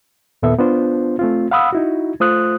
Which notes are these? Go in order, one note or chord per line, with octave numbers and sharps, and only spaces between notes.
D#2 A#2 B3 A4 E5
B3 D4 F4 C5
A3 C4 F4
F5 F#5 B5 D#6 E6
D#4 E4 F#4
A3 F4 C5 D#6 F#6